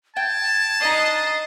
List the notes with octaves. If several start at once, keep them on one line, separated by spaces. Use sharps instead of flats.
G5 A5 G#6
D4 D#4 D#5 C7